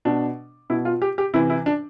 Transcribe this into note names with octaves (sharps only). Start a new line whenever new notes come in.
B2 D4
B2 E4
F4
G4
G4
C3 E3 E4
E4
D4